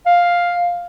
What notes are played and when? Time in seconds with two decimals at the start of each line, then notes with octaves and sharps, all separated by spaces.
0.06 F5